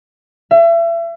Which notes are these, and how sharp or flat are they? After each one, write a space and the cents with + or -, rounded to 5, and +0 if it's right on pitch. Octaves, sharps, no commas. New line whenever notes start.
E5 +35